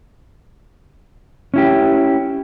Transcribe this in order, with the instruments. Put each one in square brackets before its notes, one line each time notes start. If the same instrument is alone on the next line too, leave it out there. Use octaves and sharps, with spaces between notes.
[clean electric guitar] C#4 E4 G4